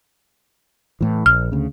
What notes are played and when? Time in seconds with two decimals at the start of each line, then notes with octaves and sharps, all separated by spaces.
1.01 A2 E3
1.26 A#1 F6
1.52 D2 C#3